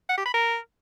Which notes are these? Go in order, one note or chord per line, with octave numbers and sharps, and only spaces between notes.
F#5
G4
B5
A#4